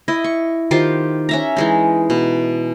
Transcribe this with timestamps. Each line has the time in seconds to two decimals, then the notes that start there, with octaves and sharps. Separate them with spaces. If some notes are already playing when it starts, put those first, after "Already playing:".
0.08 E4 D#5
0.24 C#6
0.71 D#3 F4 G4 C5
1.29 C#4 E5 A#5
1.56 E3 G#3 D#4
2.10 B2